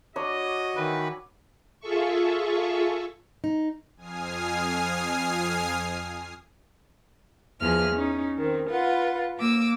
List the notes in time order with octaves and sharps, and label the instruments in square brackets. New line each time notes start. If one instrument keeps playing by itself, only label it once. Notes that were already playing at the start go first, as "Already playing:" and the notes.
[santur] D4 C#5 B5 [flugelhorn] F#4 [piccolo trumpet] D#5
[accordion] D#3 E3 B4 [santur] E6
[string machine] F4 G#4 A4 E5 C#6
[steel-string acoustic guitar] D#4
[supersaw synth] F2 G#5 D#6 F6 C7
[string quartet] E2 F3 G#4 F6
C#4 D#4
D#3 C4
F4 B4 F#5
A#3 D6 E6